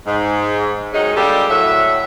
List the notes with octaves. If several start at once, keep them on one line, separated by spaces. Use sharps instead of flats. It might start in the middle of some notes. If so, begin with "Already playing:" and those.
G#2
D#3 F#3 G#3 C#4 D#4
G3 G#3 A#3 D4 G4 A4
A2 F#3 E5